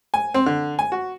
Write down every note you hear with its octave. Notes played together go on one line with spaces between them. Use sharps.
G#5
C4
D3
G#5
F#4